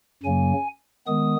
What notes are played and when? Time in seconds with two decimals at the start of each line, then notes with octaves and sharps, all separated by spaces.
0.23 F#2 C#3 F#3 A#3 G#5
1.07 D#3 G#3 B3 D#6